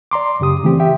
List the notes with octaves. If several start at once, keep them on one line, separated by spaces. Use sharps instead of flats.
D5 A#5 C6 D6
F#2 C#3 G4 D#6
C#3 E3 A3 C4 G4
G4 E5 G5